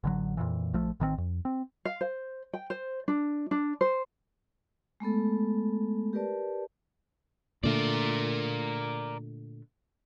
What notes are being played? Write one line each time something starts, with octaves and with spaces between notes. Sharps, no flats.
A1 D3 F#3
F2 A#2 E3
A#1 F3 A3
A1 D#3 G3 C4
F2
C4
F5
C5
G5
C5
D4
D4
C5
G#3 A3 B3 A4
G4 A#4 B4 D5 A5
A#2 D3 A3 A#4 D5